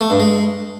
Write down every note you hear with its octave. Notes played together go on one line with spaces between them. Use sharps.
A3
G2
G#3